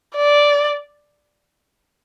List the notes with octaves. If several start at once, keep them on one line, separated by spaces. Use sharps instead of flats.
D5